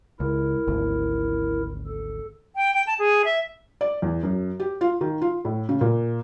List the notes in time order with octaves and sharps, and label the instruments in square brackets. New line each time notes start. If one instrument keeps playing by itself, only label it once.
[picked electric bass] C#2 [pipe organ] E4 A#4
[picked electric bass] G#1 D2
[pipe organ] A4
[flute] G5
G5
A5
G#4
E5
[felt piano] D5
E2
F#2
G4
F4
D#3
F4
A2
C#3
A#2